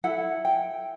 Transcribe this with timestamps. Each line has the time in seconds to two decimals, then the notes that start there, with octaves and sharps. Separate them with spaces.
0.04 E4 A4 F#5
0.45 G5